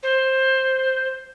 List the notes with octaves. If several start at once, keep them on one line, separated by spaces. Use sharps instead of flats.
C5